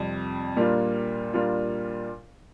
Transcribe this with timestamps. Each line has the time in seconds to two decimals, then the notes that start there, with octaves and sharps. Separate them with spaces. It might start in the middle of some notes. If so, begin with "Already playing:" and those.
Already playing: F2 C3 G3
0.56 A#2 G3 A#3 D4 F4
1.33 A#2 G3 A#3 D4 F4